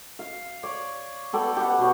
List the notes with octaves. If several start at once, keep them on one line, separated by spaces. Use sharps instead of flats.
F5
C#5 D5
B3 A4 D5 G5
G4 B4 F#5
B2 C#5